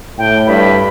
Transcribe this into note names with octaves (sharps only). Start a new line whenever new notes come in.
A2 G5
G2 B5